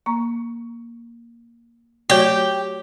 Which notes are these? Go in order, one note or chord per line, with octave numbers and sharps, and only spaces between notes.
A#3 A#5 C#6
F#3 A3 F#4 G4 C#5 D5 C#6